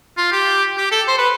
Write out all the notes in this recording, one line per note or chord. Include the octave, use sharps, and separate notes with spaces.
F4
G4
G4
A4
C5
B4